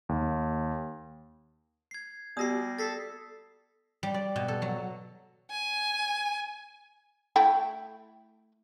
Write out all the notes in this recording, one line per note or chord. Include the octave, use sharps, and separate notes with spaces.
D#2
G#6 C7
G3 B3 F#4 G4 D#6 A#6 C7
A4 A6 B6 C7
G3
D5
B2
A4
F#3
G#5
A3 E4 G5